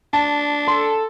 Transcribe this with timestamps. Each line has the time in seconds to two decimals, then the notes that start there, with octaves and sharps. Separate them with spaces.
0.13 D4 A5
0.68 A4 C6